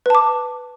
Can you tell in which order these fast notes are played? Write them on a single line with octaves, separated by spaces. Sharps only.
B4 A5 D6